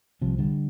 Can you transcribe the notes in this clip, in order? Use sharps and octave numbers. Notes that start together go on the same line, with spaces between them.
C2 C3 F3
D3 G3